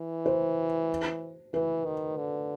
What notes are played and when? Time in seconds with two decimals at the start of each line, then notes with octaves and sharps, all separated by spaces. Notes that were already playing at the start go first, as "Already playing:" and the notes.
Already playing: E3
0.26 C5
1.54 E3 B4
1.85 D#3
2.17 D3